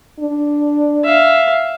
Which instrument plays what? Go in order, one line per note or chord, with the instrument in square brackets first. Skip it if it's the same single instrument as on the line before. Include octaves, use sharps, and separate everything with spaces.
[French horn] D4
[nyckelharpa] E5 F5